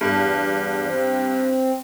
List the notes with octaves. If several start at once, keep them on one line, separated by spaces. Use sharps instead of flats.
E2 G2 D4
C4